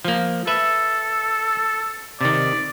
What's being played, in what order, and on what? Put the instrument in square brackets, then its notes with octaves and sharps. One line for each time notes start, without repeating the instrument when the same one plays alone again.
[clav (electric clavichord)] F3 A#3
[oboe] A4 [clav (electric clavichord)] B4 E5
[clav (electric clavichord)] C3 D#3 [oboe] D5